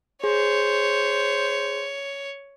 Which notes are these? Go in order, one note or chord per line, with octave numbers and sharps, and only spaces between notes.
G#4 C5 C#5